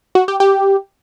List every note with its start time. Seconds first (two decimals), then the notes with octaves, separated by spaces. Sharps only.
0.15 F#4
0.28 G4
0.40 G4